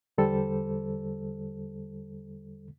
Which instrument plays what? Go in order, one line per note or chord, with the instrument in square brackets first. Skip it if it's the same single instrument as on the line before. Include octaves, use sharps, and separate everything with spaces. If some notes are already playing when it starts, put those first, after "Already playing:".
[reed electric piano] E2 D3 G3 A4 C5